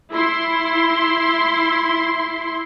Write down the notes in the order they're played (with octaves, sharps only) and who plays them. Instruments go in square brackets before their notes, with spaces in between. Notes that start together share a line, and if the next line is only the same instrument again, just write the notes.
[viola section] E4 C6